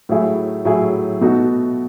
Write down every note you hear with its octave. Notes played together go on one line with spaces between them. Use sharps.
A2 F#3 A3 E4 G#4
A2 F#3 A3 E4 G#4
B2 A3 D#4 F#4